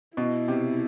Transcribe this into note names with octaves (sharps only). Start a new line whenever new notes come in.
B2 E4
C3